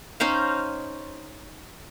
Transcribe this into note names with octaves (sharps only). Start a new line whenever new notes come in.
C#4 D#4 C5 F5